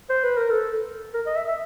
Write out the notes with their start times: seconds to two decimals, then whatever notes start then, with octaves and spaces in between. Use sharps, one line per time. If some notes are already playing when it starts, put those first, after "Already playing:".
0.10 C5
0.24 B4
0.37 A#4
0.50 A4
1.14 A#4
1.26 D#5
1.36 E5
1.48 E5